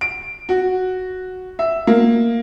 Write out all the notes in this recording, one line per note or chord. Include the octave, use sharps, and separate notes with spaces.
D7
F#4
E5
A#3